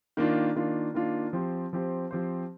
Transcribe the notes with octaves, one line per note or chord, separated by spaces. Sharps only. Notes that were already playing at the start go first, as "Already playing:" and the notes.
D#3 A#3 D4 F4
D#3 A#3 D4 F4
D#3 A#3 D4 F4
F3 C4 G4 C5
F3 C4 G4 C5
F3 C4 G4 C5